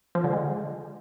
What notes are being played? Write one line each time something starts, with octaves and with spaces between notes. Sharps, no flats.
F3
D3
G#3